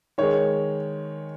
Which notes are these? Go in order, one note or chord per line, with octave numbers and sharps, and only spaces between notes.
D#3 G#3 C#5